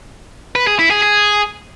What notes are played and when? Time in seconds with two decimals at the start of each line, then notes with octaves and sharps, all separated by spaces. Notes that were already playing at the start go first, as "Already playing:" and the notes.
0.55 B4
0.67 G#4
0.79 E4
0.91 G#4
1.02 G#4